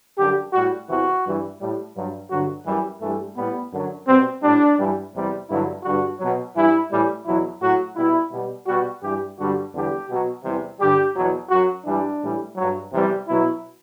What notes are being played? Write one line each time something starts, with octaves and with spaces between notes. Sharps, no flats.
F#2 D3 G3 G4
A2 G3 F#4
E2 C3 E3 F#4
G2 E3 G3
A2 G3
G2 F#3
G2 D3 F#3 F#4
F#2 E3 G3
G2 E3 G3 A3
A2 G3 B3
F#2 D3 F#3
B2 G3 C4
A2 G3 D4
G2 E3 G3
E2 C3 G3
G2 D3 F#3 E4
G2 D3 G3 F#4
B2 F#3
G2 E3 G3 E4
A2 E3 G3
E2 B2 F#3 E4
A2 F#3 F#4
B2 G3 E4
B2 G3
B2 G3 F#4
G2 E3 G3 G4
G2 D3 G3 F#4
E2 D3 G3 G4
B2 F#3
E2 C3 E3 G3
G2 D3 G3 G4
E2 B2 F#3
F#2 F#3 F#4
G2 E3 G3 D4
A2 E3 G3
G2 F#3
E2 C3 E3 G3
B2 F#3 E4